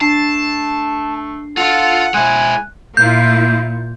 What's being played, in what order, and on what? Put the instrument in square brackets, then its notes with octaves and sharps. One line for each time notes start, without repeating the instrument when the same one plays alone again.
[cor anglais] A3 [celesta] D4 C7 [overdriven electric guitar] A5
[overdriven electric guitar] F4 F5 [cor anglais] A4 [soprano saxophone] F#5
[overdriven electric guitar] G#3 E4 [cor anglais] G#5 [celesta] F#6
[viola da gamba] A#2 [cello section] A#3 E4 F4 [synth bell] G6